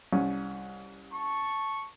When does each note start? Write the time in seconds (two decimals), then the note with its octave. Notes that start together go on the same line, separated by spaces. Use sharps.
0.13 C2 C#4
1.13 A5 C#6